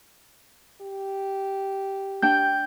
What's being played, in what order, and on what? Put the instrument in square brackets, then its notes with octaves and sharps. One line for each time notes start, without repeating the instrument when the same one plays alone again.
[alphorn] G4
[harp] D4 G5 [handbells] G6